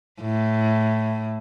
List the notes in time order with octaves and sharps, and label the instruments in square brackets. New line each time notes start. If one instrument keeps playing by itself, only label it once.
[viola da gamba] A2